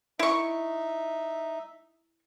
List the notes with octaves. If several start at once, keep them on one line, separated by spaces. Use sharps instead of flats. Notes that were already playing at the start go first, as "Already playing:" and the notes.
D#4 E4 E5 C#6